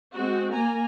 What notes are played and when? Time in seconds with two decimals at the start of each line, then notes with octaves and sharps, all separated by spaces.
0.14 G#3 C4 F#4
0.54 A#3 G#5 A#5